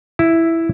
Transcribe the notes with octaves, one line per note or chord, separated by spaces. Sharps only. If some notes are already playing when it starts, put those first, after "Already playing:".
E4